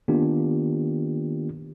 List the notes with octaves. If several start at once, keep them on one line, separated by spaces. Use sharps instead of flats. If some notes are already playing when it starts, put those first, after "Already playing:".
D#3 A#3 B3 D4 F4 G4